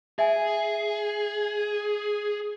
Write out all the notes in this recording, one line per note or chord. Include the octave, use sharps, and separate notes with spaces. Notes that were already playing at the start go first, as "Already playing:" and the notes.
G#4 E5 G#5